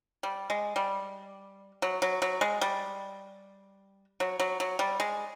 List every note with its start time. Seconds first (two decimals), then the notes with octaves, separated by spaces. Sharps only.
0.23 G3
0.50 G#3
0.76 G3
1.82 F#3
2.02 F#3
2.22 F#3
2.41 G#3
2.61 G3
4.20 F#3
4.40 F#3
4.60 F#3
4.79 G3
5.00 G#3